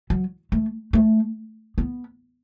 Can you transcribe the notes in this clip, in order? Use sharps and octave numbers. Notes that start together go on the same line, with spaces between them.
F#3
A3
A3
B3